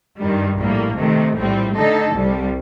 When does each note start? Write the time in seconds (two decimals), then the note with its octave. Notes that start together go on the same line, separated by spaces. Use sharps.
0.19 G2 D#3 G3
0.58 A#1 A2 G3 A#3
0.97 C3 D#3 A3
1.36 A#1 A2 G3 C4
1.75 D3 A3 D#4 A4
2.13 C2 C3 G3